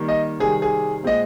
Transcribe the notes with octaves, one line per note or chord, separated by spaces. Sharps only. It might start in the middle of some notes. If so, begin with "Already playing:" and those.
Already playing: D#3 G3 A#3
D#5
C3 D#3 G3 C4 G#4
G#4
A#2 G#3 C4 D#5